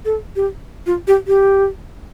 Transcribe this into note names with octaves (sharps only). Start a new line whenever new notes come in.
A4
G4
F4
G4
G4